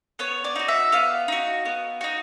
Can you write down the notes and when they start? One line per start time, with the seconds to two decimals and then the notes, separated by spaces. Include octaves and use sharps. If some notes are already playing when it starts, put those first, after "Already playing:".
0.19 B3 C#5
0.44 D5
0.55 D#4 F#4
0.68 E5
0.92 B3 F5
1.28 D#4 F#4
1.65 B3
2.01 D#4 F#4